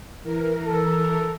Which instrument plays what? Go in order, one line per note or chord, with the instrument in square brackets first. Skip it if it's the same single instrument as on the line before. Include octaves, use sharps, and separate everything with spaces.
[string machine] E3 A#4
[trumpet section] A4